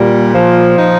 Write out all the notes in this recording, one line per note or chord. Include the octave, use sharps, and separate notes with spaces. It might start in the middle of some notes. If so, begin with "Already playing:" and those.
Already playing: A#2 G3
F3
D#4